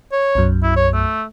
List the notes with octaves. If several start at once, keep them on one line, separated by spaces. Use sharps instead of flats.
C#5
B1 F#2
E4
C#5
A3